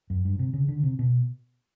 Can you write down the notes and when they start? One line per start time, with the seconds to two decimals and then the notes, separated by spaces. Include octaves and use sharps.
0.10 F#2
0.25 G2
0.39 C3
0.53 C#3
0.68 D3
0.83 C3
0.99 B2